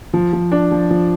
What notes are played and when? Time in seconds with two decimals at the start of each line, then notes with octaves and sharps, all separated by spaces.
0.13 F3
0.33 F3
0.52 D4
0.72 F3
0.90 F3